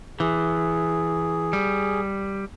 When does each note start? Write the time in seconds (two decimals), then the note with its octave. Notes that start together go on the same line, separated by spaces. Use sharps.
0.20 E3 G#4
1.53 G3